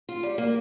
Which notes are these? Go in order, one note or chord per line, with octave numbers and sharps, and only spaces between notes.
F4
G3
A#3